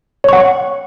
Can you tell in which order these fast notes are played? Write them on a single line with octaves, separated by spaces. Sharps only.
C#5 C#6 F#5